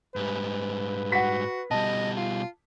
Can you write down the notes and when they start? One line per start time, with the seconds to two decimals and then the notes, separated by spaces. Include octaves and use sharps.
0.16 G#2 G3 B4
1.12 F#4 F#5 B6
1.71 B2 G3 D#5 A5
2.17 F4